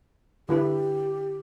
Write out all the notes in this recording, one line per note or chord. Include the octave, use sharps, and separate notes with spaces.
D3 E4 G4 B4